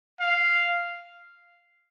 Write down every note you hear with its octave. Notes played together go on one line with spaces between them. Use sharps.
F5